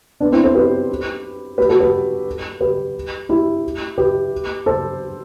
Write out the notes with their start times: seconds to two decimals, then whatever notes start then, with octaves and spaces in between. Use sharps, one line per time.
0.20 B3 D4
0.32 C4 E4
0.44 A4 C5
0.55 G4 B4
1.58 G4 B4
1.69 F#4 A4
1.80 G4 B4
2.61 G4 B4
3.29 E4 G4
3.98 G4 B4
4.66 A4 C5